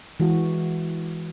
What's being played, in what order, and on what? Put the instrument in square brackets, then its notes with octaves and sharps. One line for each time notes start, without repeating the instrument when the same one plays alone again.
[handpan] E3 G#3 F#4